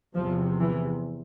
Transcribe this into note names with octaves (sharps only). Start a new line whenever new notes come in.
E2 C3 F3
E3